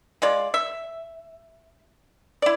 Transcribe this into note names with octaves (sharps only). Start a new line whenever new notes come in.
G#3 F4 D5
E5
E4 D5